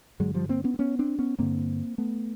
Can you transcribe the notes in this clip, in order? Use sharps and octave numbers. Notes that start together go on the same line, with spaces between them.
G2 D3 F#3 G#3
F3 G3
A#3 C4
B3 C#4
C4
B3 C#4
C4 D4
B3 C#4
G2 D3 A#3 C4
A3 B3